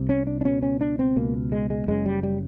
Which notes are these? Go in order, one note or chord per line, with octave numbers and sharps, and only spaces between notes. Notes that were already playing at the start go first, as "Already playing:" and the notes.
Already playing: C2 C3
C#4
D4
D4
C#2 B2 C#4
C#4
D4
C4
C#2 B2 A#3
G#3
G#3
F#1 F#2 C#3 G#3
G3
G3